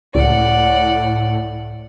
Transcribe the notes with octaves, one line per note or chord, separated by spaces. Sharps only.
C#2 A2 D5 F#5